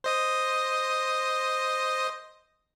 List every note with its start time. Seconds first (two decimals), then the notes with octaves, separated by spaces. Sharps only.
0.04 C5 D#5 D#6